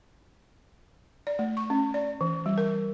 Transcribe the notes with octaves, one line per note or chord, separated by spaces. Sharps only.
D5
A3
C#6
C#4
D5
E3
G3
A#4